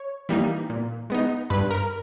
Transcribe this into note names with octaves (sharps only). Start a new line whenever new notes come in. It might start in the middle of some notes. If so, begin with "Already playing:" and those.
Already playing: C#5
E3 G3 A#3 D#4
A#2
G#3 B3 D#4
G2 B4
A#4